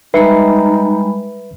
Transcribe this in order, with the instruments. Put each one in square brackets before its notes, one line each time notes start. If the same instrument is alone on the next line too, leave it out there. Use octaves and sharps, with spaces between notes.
[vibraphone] G3 G#3 B5 [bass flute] D#4 [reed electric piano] B4 E5